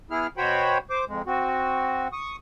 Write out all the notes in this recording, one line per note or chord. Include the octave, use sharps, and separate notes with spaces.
B3 E4 G#4 F6
B2 F#4 C5 C#5 G5 B5
C5 D6
F2 G#3
C4 F#4
C#6 D#6